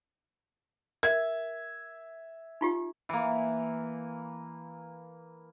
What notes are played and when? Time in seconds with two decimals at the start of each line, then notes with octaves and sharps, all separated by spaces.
1.03 A#4 E5 G#6
2.61 D#4 F4 G4
3.09 E3 A#3